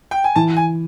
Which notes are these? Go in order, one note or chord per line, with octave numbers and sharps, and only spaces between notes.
G5
G#5
E3 A5
G#5